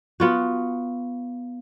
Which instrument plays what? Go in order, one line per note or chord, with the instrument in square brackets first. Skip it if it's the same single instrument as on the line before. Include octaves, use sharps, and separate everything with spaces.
[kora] B3 F4 F#4